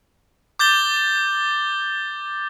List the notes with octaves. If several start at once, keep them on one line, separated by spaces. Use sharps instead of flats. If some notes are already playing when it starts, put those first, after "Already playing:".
D6 G6 A6 G7